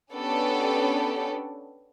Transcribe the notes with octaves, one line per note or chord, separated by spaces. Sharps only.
B3 C#4 D4 G4 A4 D5